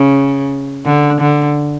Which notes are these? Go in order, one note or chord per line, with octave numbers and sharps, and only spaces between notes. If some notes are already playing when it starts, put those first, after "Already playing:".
Already playing: C#3
D3
D3